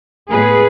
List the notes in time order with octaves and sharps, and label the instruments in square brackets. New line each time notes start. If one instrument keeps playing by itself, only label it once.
[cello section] A2 G#3 B3 G#4 B4